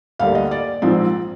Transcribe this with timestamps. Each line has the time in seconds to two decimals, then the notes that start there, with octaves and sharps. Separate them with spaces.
0.19 D2 D3 G3 A#3 F5
0.35 D#5
0.51 D5
0.82 A#1 G#2 F3 C4